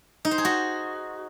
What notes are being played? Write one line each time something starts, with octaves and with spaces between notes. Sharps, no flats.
D#4
C5
G#4
F#4